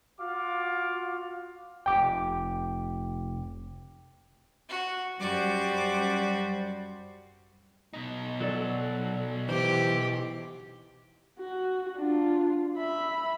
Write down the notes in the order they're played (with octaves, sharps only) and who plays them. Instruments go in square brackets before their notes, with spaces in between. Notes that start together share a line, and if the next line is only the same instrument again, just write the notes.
[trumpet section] F4 F#4 F5 D6
[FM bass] F1 [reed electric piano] G5 D6
[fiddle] F#4
[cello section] F#2 G3 C5 [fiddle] F#4 D6
[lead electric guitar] B2 D#4
[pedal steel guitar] F#3 A4 D5
[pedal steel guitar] E3 C5 [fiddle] G4
[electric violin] F#4
D4 F4
E5 B5